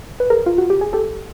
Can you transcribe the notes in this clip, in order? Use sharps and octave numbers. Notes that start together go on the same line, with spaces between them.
B4
G#4 A#4
F4
F#4
G4
G#4
G4 A4